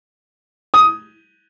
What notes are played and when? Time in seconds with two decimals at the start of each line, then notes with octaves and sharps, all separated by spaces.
0.74 D#6